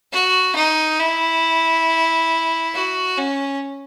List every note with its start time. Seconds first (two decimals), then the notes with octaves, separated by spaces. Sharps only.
0.12 F#4
0.56 D#4
1.00 E4
2.75 F#4
3.18 C#4